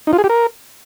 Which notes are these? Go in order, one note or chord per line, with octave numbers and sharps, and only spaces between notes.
D#4
F4
G#4
G4
A#4